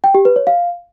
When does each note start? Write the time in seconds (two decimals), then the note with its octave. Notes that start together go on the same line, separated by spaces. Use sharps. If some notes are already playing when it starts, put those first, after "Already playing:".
0.04 G5
0.14 G4
0.25 B4
0.36 C#5
0.47 F5